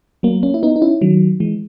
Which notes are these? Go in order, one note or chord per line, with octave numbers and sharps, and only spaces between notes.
F#3 A#3
A#3 C#4
E4
B3 D#4
D#4
C#4 E4
D#3 F#3
E3 G#3